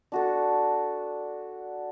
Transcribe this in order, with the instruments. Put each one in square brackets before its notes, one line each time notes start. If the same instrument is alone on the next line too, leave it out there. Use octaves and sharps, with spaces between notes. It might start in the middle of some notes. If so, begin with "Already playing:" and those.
[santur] D4 F#4 A4